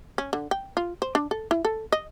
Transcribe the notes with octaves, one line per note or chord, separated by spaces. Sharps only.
C#4
D3
G5
F4
C5
D4
A4
E4
A4
D#5